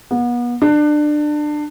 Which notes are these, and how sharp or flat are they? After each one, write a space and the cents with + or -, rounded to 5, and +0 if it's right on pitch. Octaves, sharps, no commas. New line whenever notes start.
B3 -35
D4 +25